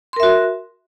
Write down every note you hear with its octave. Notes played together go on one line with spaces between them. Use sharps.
F#4 A#4 E5 C6